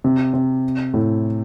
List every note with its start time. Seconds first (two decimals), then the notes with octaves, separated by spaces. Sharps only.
0.04 C3
0.34 C3
0.94 A2